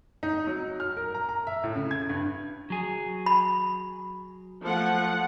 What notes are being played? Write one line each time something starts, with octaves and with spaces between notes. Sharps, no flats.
D#4
F#3
F6
A#4
A#5
A#5
E5
A2
C#3
G#6
G2
F#3 G#4
B5
F3 A3 F#5